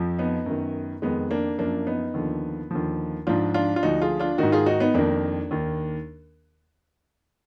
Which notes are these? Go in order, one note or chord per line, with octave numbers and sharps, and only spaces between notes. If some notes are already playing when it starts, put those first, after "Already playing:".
Already playing: F2 F3
B3 D#4
F#2 D#3
F2 D#3 G#3 B3
A#3 D4
F#2 F3 A#3 D4
B3 D#4
D#2 D3 F3
D#2 D3 F3
G#2 F3 D4 F4
D4 F4
F4
D2 D3 F3 D#4 F#4
F4 G#4
D4 F4
G#2 D#3 D#4 F#4
F4 G#4
D#4 F#4
B3 D#4
F2 D#3 A#3 D4
D#2 D#3